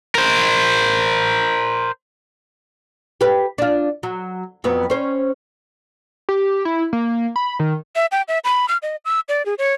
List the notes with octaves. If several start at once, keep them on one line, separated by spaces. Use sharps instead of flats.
A#4 C5
G4 B4
D4 F4
F#3
F2 F#3 B3
C#4 C5
G4
E4
A#3
B5
D#3
E5
G5
E5
B5
F6
D#5
E6
D5
G#4
C#5